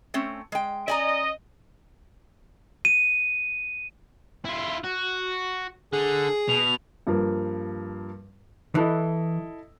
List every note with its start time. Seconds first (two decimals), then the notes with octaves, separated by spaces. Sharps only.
0.14 A3 C4 C#4
0.52 G#3 G5
0.88 C#4 D5 D#5 G#5 A#5
2.85 D#7
4.45 E4 F4
4.84 F#4
5.93 D3 G#4
6.48 B2 F7
7.07 G2 F3 A#3
8.75 E3 E4 A4 D#5